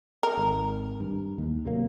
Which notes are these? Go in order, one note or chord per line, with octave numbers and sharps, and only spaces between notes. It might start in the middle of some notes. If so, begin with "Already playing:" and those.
A#4
G#1
G2
D#2
C3 F#3 A#3